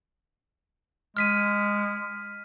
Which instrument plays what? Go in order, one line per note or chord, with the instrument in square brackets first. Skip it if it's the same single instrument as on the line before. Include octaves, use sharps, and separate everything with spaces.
[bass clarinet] G#3 [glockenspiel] F6 B6 D#7